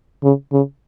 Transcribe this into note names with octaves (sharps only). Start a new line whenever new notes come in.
C#3
C#3